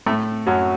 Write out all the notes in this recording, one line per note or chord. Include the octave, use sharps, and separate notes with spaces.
A2 A3
F#2 F#3